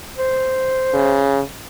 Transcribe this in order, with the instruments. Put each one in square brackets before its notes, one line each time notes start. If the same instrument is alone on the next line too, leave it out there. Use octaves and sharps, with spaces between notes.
[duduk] C5
[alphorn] C#3